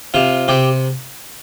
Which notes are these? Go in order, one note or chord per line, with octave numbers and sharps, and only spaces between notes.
C3 F4
C3 G4